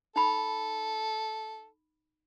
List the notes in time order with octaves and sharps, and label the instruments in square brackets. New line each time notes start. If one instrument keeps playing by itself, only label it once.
[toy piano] D#4 B5 [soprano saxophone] A4